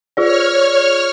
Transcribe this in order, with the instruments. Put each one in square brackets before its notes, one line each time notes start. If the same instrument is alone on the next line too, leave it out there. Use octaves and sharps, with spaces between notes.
[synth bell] F4 G#4 D5 [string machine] C#5 F6